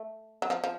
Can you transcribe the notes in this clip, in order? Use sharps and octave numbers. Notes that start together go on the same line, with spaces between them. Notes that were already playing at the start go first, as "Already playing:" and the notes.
Already playing: A3
F#3
F3
F3